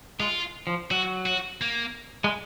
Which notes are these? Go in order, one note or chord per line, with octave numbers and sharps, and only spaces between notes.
G#3 F4
F3
F#3 F#4
F#4
A#3
G#3